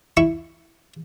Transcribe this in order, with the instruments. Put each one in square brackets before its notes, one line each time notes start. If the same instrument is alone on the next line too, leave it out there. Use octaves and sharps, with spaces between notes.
[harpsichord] E4 C#6